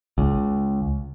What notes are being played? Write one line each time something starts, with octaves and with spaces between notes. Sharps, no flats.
C#2